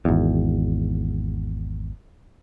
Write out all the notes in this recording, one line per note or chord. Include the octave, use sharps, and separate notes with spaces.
G#1 E2